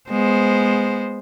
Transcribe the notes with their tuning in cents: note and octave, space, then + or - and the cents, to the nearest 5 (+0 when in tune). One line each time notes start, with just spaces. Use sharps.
G#3 +0 B3 +0 C5 +0